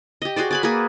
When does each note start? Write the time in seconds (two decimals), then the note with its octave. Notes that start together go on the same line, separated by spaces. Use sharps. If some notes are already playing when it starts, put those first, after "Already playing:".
0.22 G4 D#5
0.36 F#4 G#4 C5 D5
0.51 D5 G#5 B5
0.63 A#3 F#4 G#4 B4